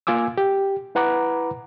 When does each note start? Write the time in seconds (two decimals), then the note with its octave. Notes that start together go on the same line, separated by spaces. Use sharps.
0.07 A#3 F4 G#5 D6 E6
0.38 G4
0.95 E4 B4 F#5 A#5 B5 D6